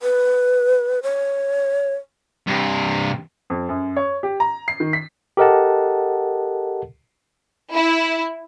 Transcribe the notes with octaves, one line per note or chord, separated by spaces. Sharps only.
B4
C#5
G2 C3
F2
F#2
C#5
G4
A#5
C7
D#3
B6
G4 A4 A#4 D#5 F#5 A5
E4